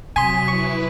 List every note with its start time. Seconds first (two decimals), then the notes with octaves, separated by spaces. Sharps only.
0.16 C3 F#3 G#5 C6 D#6 B6 D#7
0.48 E4 B4 C#6